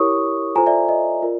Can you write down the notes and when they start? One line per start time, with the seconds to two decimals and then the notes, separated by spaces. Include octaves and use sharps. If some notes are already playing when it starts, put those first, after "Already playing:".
Already playing: E4 G4 A#4 C#5 C#6 D#6
0.56 F4 A4 C5 G#5 A#5
0.66 D5 E5
0.89 D#5
1.22 F4 A#4 D5